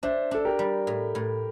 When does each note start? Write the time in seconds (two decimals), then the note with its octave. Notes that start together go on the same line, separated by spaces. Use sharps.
0.03 D4 C5 E5
0.31 D4 A4
0.45 G4 A#4
0.59 G3
0.87 A2
1.15 A2